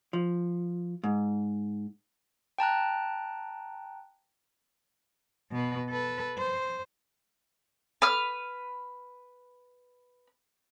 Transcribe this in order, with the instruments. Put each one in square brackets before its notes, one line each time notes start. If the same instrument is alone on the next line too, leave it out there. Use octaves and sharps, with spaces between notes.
[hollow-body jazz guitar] F3
G#2
[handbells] G5 A5 A#5 F#6
[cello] B2 B4
A4 B4
C5
[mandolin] B4 F6